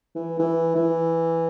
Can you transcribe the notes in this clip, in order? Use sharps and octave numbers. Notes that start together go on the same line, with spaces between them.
E3
E3
E3